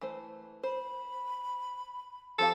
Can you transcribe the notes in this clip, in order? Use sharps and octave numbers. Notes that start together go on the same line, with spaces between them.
E3 A3 C5
C5 B5
F3 C4 G4 A4 F5